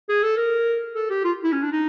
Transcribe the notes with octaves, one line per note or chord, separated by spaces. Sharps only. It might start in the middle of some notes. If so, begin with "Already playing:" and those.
G#4
A4
A#4
A4
G4
F4
E4
C#4
D4
D#4